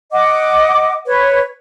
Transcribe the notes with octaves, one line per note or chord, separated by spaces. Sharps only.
D#5 F#5 D6
B4 C#5